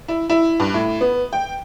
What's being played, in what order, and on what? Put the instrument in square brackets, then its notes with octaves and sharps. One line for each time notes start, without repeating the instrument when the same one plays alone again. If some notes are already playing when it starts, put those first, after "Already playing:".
[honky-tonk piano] E4
E4
G2
A2
B3
G5